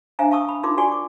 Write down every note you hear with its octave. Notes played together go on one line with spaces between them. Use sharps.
D4 C5 E5 F5 G#5 A#5
F5 A5 C#6 D#6 E6
B5
D#4 F4 A#4 C6 D6
F#4 D5 G#5 C#6
D6